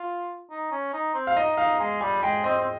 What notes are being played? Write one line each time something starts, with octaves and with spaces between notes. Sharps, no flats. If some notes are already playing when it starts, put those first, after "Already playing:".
Already playing: F4
D#4
C#4
D#4
C4
F5
D#4 D#5
D#4 F5
G#3
G3 G#5
G#3 G5
C4 D#5
C4